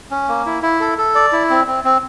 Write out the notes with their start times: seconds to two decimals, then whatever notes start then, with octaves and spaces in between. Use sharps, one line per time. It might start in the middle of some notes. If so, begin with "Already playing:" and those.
0.11 C#4
0.28 A#3
0.46 E4
0.62 E4
0.80 A4
0.98 A4
1.15 D5
1.33 E4
1.50 C4
1.67 C4
1.84 C4